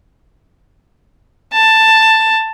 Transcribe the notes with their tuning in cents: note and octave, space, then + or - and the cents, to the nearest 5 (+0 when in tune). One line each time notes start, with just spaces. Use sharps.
A5 +10